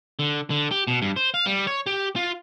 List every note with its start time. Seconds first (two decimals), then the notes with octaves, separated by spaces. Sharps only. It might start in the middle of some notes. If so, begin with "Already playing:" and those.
0.19 D3
0.50 D3
0.71 G4
0.88 B2
1.02 G2
1.16 C5
1.34 F5
1.46 G3
1.67 C#5
1.86 G4
2.16 F4